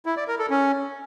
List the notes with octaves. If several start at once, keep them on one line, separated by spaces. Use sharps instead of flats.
E4
D5
A#4
A4
C#4